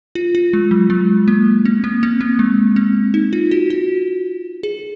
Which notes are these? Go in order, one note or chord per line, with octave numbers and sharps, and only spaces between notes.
F4
F4
G#3
F#3
G#3
A#3
C4
A#3
C4
A#3
G#3
C4
D#4
F4
F#4
F#4
G#4